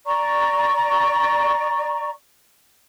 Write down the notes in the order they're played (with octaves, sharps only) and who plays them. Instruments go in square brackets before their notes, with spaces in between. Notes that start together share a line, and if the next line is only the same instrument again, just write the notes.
[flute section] D5 A#5 C#6